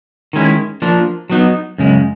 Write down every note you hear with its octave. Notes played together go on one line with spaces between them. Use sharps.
D#3 G#3 C#4 E4
F3 A#3 D4
F#3 B3 D#4
F#2 C#3 G#3